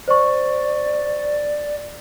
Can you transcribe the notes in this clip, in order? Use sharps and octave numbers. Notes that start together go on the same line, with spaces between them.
C5 D5 C#6